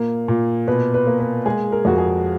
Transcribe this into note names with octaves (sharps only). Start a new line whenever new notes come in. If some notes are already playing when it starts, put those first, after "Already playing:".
Already playing: A#2 A#3
A#2
B2 B4
B4
A#3
B4
G#3 G#4
A#4
F2 F#4
G#4